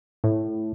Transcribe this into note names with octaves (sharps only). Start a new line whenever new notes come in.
A2